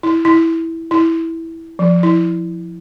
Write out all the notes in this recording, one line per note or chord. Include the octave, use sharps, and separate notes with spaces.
E4
E4
E4
F3
E4